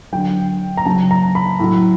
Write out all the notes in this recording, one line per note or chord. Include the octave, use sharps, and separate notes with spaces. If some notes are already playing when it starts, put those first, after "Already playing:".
D3 F#3 G5
A#5
C#3 F#3 A5
A#5
B5
A2 F#3